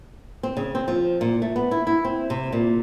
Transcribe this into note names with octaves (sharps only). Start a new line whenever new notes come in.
C4
C#3
C4
F3
A#2
A3
B3
E4
E4
C4
C3
A#2